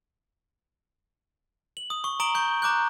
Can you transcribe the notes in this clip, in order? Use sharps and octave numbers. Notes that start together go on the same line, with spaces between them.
F#7
D#6
C#6
A#5 D#6 D7 F#7 G7
C#6 G6
A#5 D6 F#6 G6